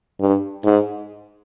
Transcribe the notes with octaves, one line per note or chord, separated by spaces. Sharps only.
G2
G#2